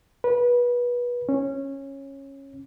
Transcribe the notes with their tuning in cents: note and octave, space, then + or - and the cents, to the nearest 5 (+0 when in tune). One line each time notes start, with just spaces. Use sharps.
B4 -25
C#4 -15